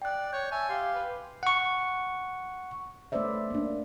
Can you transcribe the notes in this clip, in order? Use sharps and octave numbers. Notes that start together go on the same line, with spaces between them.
D5 G5 F#6
C#5 G6
E5 G#5 A5
G4 F5 C6
B4
F#5 C#6
A3 C#4 B4 C5 D5 E5
A#3 D4